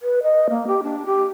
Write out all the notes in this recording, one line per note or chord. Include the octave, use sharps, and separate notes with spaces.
B4
D#5
A#3
G4
D4
G4